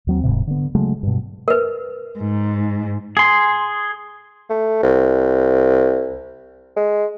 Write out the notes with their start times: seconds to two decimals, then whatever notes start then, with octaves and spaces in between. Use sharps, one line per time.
0.07 D#2 F#3 C4
0.23 D#1 F2 G#2 C3
0.47 D3 B3
0.75 C#3 F#3 G#3 A3
1.03 G2 B2
1.48 A#4 B4
2.19 G#2
3.17 G#4 C6
4.50 A3
4.83 C2
6.77 G#3